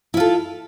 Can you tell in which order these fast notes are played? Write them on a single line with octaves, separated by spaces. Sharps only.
E4 F4 A4